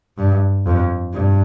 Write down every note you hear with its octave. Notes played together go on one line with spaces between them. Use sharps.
G2
F2
G2